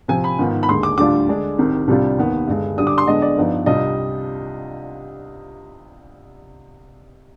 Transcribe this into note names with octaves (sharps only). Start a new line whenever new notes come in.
C3 F3 C4 G#5
B5
G#2 D#3 B3 F4
B5
D#2 D3 G#3 C6
D6
D2 D3 G3 D4 F4 D6
D3 G#3 D4
C2 C3 D#3
C2 C3 G3 D4 F4
D#2 D#3 B3
G2 D3 G#3
D3 G3 D4 D#6
D6
C6
D3 G#3 B3 D4 D#5
D5
G2 F3 B3 D#4
C2 C3 G3 D4 F4 D#5